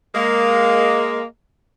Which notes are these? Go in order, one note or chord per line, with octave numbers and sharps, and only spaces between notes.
G#3 A#3